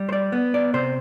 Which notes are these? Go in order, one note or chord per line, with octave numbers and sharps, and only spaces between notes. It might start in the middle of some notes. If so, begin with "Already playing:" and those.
Already playing: G3
C5
D5
B3
D5
C3 C5